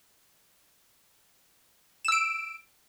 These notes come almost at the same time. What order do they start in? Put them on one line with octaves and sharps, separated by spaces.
E7 E6 D7